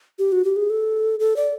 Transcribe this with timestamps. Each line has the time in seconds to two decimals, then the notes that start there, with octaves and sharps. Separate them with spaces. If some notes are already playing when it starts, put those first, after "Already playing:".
0.19 G4
0.32 F#4
0.44 G4
0.56 G#4
0.70 A4
1.20 A4
1.36 D5